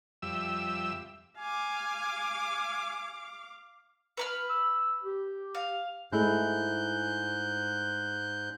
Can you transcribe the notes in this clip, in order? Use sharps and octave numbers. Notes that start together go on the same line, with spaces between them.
F2 G3 E5 E6
F5 G#5 D6
B4 B5 F6
E6
G4
F5
G#2 G#3 A3 E4 F#6 G6